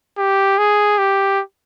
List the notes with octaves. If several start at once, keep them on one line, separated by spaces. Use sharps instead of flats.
G4
G#4
G4